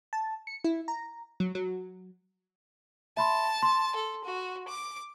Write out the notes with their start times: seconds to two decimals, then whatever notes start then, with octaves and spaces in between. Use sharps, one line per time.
0.13 A5
0.47 C#7
0.64 E4
0.88 A#5
1.40 F#3
1.55 F#3
3.17 E5 A5 B5 C6
3.63 C6
3.95 A4
4.24 F#4
4.68 D6